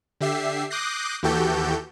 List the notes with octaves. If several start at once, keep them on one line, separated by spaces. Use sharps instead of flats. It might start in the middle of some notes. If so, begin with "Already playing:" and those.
D3 G4 E5 C7
D6 D#6 F#6 G6 A#6 C7
D#2 E3 F#4 G4 A4 G6